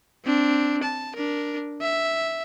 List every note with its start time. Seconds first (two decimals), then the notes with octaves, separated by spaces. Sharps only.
0.25 C4 D4
0.83 A5
1.15 D4 A#4
1.82 E5